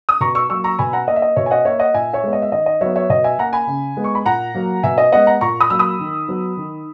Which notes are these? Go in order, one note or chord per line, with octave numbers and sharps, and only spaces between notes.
D#6
B2 A#5 C#6
C#6 E6
F#3 A#3 C#6 E6
A#5 C#6
B2 G#5 B5
F#5 A#5
A#3 D#5
E5
D#5
B2 C#5 E5
G#5
D#5 F#5
A#3 C#5 E5
D#5 F#5
A#2 E5 G#5
C#5 E5
G#3 B3
D#5
E5
D#3 D#5
D#5
F#3 B3 C#5 E5
C#5 E5
B2 D#5
E5 G#5
A#3 F#5 A#5
G#5 B5
C#3
G#3 B3
C#6
B5
A#2 F#5 A#5
F#3 A#3
B2 E5 G#5
D#5
G#3 B3 D#5 F#5
F#5 A#5
A#2 A#5 C#6
B5 D#6
F#3 A#3 E6
B5 D#6
D#3
F#3 B3
D#3